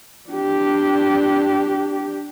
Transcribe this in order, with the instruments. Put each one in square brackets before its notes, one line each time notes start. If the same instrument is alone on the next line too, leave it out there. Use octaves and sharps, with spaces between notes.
[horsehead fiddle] D4 G4